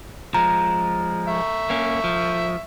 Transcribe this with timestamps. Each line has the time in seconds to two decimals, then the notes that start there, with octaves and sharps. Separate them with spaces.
0.34 F3 G#3 A#5
1.28 E5 C#6
1.70 A#3 C#4
2.04 F3